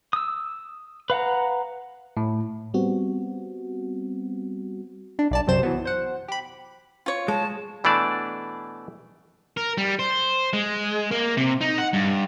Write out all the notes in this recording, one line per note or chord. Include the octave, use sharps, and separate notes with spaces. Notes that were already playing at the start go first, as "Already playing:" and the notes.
D#6 E6
B4 F5 F#5 A#5
A2
G3 B3 C4 F#4
D4
B1 D5 A5
F#2 C3 F#3 C4 C5 E7
E3 F#3 B3
C5 F#5
G4 B5
F4 C#5
G#3 A5
B2 E3 A3 D4 D5 A5
A#4
G3
C5
G#3
A#3
C3
D#4
F#5
G2